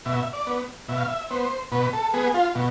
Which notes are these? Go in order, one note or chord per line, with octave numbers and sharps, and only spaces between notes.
B2 E5
D5
B3
B2 E5
F5
E5
B3 C5
B2 B4
A4
B3 G#4
F4
B2